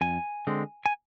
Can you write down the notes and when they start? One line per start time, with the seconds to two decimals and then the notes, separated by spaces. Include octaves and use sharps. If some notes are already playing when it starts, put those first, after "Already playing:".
0.01 F2 G#5
0.47 D3 G#3 C4
0.86 G#5